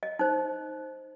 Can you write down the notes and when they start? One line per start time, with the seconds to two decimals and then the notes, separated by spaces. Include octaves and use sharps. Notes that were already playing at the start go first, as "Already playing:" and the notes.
0.03 D#5
0.19 D#4 C5